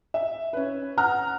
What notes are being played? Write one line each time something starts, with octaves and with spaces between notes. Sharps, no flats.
E5
C#4 B4
F#5 A#5 F6